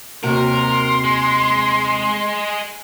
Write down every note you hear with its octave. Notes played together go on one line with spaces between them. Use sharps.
D#2 C3 F#4 A#4 C6
G#3